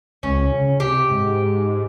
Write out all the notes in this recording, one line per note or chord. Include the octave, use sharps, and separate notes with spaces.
C#2 C#4
C#3
C3 G4
G#2